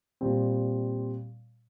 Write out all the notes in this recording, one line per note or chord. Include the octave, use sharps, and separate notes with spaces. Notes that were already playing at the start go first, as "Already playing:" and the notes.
A#2 G3 C4